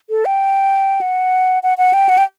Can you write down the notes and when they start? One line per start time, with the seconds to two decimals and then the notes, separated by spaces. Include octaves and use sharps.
0.10 A4
0.25 G5
1.01 F#5
1.63 F#5
1.78 F#5
1.93 G5
2.09 F#5
2.18 G5